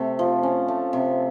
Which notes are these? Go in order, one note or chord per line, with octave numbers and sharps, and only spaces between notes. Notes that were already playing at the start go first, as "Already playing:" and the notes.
Already playing: C3 A3
F3
C#4
A3
C3